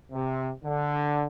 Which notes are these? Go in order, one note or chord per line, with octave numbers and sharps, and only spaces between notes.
C3
D3